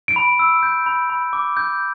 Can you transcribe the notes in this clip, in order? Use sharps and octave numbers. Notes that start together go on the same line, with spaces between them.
D7
B5
E6
G6
B5
B5
D6
G6